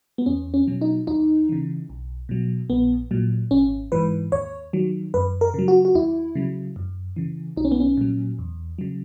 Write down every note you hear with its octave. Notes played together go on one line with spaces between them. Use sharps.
B3
E2 C#4
C#4
B2 F#3
D#4
D#2 D#4
C#3 E3
B1
B2 F#3
A#1 B3
A#2 F#3
G#1 C#4
G#2 E3 B4
D#2 C#5
D#3 F#3
F#2 B4
A#4
C#3 F#3
F#4
F#4
D#2 E4
C#3 F#3
F#2
C#3 E3
B1 D#4
C#4
B3
C#4
A#2 F#3
E2
C#3 F#3